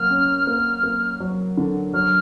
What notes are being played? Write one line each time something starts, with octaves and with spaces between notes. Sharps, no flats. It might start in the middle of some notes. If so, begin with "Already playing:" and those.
Already playing: F#3 A#3 F6
C#4
A#3
A#3
F#3
D3
F#3 F6